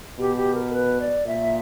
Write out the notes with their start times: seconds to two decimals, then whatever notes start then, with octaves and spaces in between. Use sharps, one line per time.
0.19 B2 G4
0.37 G4
0.55 A#4
0.73 B4
1.00 D5
1.26 A#2 E5